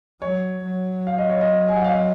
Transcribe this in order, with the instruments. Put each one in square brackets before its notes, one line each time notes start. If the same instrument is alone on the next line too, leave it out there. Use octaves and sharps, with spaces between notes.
[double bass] F#3 [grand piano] C#5
[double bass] F#3
[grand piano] F5
D#5
C#5
D#5
G#5
F#5
F5
D#5